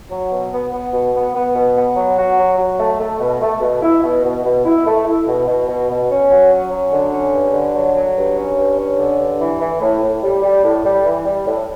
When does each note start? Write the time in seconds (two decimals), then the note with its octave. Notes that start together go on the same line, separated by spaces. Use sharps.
0.10 F#3
0.30 B2
0.52 B3
0.72 B3
0.92 B2
1.14 B3
1.35 B3
1.54 B2
1.76 B3
1.96 F#3
2.17 F#4
2.38 F#3
2.58 F#3
2.79 A3
2.99 A3
3.19 B2
3.40 A3
3.61 B2
3.82 E4
4.03 B2
4.23 B2
4.44 B2
4.65 E4
4.86 A3
5.06 E4
5.26 B2
5.47 B2
5.68 B2
5.89 B2
6.10 C#4
6.30 F#3
6.51 C#4
6.71 F#3
6.92 D3
7.12 C#4
7.33 G2
7.54 D3
7.74 F#3
7.94 F#3
8.16 G2
8.36 C#4
8.57 G2
8.77 C#4
8.98 D3
9.19 G2
9.39 E3
9.60 E3
9.80 A2
10.02 A2
10.21 G3
10.42 G3
10.63 A2
10.83 G3
11.05 E3
11.25 G3
11.46 A2